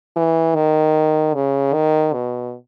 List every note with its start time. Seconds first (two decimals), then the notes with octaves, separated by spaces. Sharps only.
0.17 E3
0.55 D#3
1.34 C#3
1.74 D#3
2.14 B2